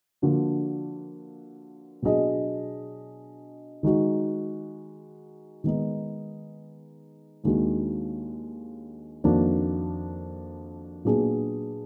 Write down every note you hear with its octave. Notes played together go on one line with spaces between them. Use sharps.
D3 F3 A#3 D4 F#4
B2 F#3 D4 G#4 D#5
D#3 G#3 D#4 F#4
D#3 G#3 B3 D#4
D#2 D#3 G#3 D4 F#4
F2 D#3 A#3 D4 F#4
A#2 F#3 B3 D4 G#4